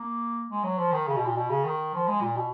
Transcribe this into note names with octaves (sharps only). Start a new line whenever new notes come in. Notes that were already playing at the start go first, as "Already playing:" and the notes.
Already playing: A#3
G#3
F#3
F3
D#3
C#3
B2
A#2
B2
C#3
D#3
F3
G#3
A#2
B2